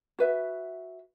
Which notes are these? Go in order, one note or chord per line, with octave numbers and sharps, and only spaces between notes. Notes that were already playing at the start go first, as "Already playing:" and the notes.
F#4 B4 E5